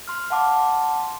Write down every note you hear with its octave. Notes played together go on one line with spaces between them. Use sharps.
C6 F6
F5 F#5 A5 C6 D6